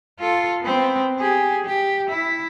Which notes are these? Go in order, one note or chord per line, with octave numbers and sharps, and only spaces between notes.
F4 A4
B3 C4
G4 G#4
G4
E4 E5